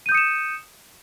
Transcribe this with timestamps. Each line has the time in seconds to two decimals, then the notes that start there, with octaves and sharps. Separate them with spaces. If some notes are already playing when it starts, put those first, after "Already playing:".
0.06 D#7
0.09 G6
0.12 D#6
0.15 C#7
0.17 E7